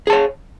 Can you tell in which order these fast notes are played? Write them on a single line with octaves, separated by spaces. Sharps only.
G#4 A5 C#5